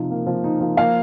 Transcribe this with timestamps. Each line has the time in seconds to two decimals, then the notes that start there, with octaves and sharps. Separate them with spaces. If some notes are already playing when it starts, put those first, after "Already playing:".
Already playing: C3 F3 D#4
0.11 A#3
0.27 F3
0.44 D#4
0.61 F3
0.77 A#3 F5